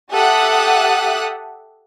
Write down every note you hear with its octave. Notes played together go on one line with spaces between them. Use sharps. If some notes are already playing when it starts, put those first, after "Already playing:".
G4 A4 E5 F#5 D#6 F#6